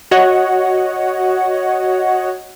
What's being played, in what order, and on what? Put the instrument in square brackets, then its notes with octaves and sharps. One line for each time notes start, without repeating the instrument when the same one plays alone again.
[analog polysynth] F#4 C#5 D#5 F#5